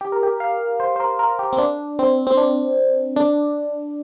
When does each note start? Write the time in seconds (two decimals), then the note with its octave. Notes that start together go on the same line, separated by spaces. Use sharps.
0.01 G4
0.12 A#4
0.23 G4
0.40 F5
0.80 C5
0.96 C5
1.00 A#4
1.19 A#4
1.39 G4
1.53 C4
1.58 D4
1.99 C4
2.27 C4
2.37 D4
3.16 D4